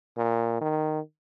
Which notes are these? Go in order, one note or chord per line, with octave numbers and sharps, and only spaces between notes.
A#2
D#3